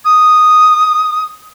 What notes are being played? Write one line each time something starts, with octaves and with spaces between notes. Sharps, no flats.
D#6